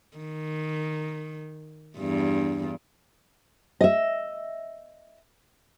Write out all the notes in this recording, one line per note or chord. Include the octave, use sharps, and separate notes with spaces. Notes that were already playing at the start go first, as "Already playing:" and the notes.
D#3
E2 G2
D#5 E5